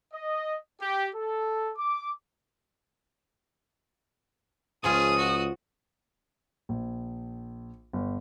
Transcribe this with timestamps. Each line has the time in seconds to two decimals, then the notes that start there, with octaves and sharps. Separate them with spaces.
0.14 D#5
0.80 G4
1.15 A4
1.78 D6
4.84 C#2 F3 C#4 F4 G#4 D#6
5.18 F#4
6.69 A#1
7.93 G1